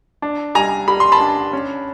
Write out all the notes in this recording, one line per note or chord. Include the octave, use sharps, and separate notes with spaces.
D4
G3 G#5 A#5
G3 B5
C6
A5 B5
D4
C#4